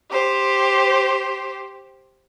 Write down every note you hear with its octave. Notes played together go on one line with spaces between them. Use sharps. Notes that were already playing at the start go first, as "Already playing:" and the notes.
G4 C5